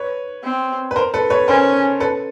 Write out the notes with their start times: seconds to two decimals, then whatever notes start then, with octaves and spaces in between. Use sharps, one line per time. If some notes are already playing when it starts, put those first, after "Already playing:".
Already playing: B4 C#5
0.44 C4
0.91 B4
0.96 A#4 C5
1.14 A4 B4
1.30 B4 C#5
1.48 C#4 A#4 C5
2.00 A4 B4